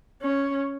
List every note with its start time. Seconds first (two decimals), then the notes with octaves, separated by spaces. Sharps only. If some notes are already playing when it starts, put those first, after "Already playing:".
0.22 C#4